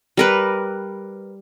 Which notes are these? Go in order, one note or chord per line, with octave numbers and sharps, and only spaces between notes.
G3 A#4 B4